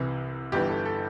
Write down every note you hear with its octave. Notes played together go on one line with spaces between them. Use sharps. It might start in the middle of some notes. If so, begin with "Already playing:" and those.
Already playing: C2 C3 E3
G1 G2 E3 G4
A4
A4